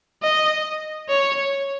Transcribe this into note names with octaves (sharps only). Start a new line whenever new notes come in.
D#5
C#5